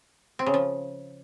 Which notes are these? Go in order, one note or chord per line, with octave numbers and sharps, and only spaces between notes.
C4
C#3
F3